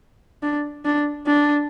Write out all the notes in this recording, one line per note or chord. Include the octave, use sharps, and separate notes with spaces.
D4
D4
D4